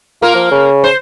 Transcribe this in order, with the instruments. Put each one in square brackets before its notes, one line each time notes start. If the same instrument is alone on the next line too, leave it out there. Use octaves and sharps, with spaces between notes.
[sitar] A#3 A#4 [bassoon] F4
[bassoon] F3
C#3
[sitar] C5